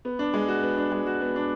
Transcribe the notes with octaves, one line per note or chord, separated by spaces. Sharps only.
B3
D4
G#3
F#4
B3
D4
G#3
F#4
B3
D4